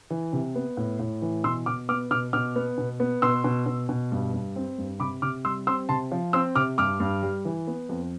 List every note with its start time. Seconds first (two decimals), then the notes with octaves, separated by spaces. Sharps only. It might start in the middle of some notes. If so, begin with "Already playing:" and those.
0.10 E3
0.33 C3
0.55 B3
0.77 A2
0.99 A2
1.22 E3
1.44 B2 C6 E6
1.66 B2 D6 F6
1.89 B3 D6 F6
2.11 B2 D6 F6
2.33 B2 D6 F6
2.56 B3
2.78 B2
3.00 B3
3.22 B2 C6 E6
3.44 B2
3.66 B2
3.89 B2
4.12 G2
4.34 G2
4.56 C4
4.78 G2
5.00 C3 B5 D6
5.22 C3 D6 F6
5.45 G3 C6 E6
5.67 C4 C6 E6
5.89 C3 A5 C6
6.12 F3
6.33 C4 C6 E6
6.55 C3 D6 F6
6.78 G2 D6 F6
7.00 G2
7.23 G3
7.45 E3
7.67 B3
7.89 F2